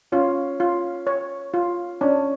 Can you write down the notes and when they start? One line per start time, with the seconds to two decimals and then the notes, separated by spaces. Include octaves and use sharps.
0.12 C#4 F4
0.60 F4
1.07 C#5
1.54 F4
2.01 C#4 D4